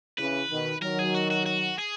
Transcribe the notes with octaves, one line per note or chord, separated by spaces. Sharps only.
C#3 E3 B4
B2 D#3
D#3 F#3 A#4
G#4
F#4
F#4
F#4
G#4